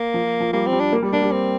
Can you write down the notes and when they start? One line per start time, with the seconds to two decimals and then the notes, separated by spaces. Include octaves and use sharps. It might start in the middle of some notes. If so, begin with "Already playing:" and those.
Already playing: A#3
0.14 F3
0.40 F3
0.53 G3 A#3
0.66 C4
0.73 G3
0.80 D4
0.93 A#3
1.02 G3
1.13 A#3 D4
1.22 G3
1.32 C4